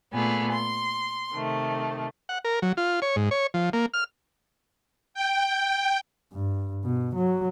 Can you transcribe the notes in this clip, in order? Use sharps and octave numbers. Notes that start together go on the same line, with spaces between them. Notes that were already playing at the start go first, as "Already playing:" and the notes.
A#2 A3 B3 G#4
C6
C3 D#3 A3
F#5
A#4
F#3
F4
C#5
G#2
C#5
F3
A#3
F6
G5
G2
B2
F#3